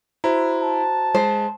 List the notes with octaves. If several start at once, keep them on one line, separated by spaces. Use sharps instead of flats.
E4 F#4 C5 A#5
A5
G#3 C5